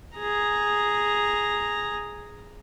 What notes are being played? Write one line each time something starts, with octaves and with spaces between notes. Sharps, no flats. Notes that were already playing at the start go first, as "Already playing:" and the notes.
G#4 A#5